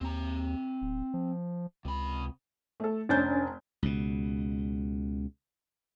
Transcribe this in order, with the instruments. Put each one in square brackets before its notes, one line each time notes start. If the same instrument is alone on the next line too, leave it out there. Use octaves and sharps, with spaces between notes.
[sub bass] D#2 [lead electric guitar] C4 A#5
[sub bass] D1
F3
[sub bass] C#2 [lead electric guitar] C3 B5
[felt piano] A3 A4
[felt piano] F1 G#5 G6 [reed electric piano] C#4 D4 A6
[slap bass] C#2 B2